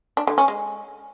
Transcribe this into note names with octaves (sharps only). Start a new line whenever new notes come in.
D4
D3
C#4
G#3